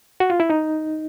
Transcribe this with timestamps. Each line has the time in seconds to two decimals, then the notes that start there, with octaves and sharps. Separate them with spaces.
0.20 F#4
0.30 F4
0.40 E4
0.50 D#4